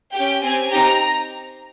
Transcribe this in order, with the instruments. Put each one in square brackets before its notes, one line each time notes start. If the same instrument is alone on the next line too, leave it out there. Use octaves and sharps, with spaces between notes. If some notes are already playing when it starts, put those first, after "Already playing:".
[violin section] C#4 G4 G5
C4 G4 G#5
C4 D#4 G4 A#5